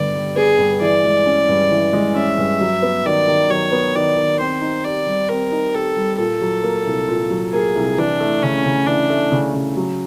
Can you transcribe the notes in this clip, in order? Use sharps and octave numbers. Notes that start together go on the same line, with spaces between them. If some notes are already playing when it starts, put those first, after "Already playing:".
Already playing: G2 D3 B3 D5
G3
B3 G#4
G2
E3 D5
G#3
C#4
G2
E3
G#3
C#4 E5
G2
F#3
B3
D#3 D5
D#3
F#3 C#5
B3
D#3 D5
D#3
C4 C5
D#4
G4 D5
G3
C4 A#4
D#4
G4 A4
G3
A#2 A4
F#3
A#3
C2
A#2
F#3
A#3 G#4
C2
E3 D4
A3
C#3 C#4
C#3
E3 D4
A3
C#3
C#3
F#3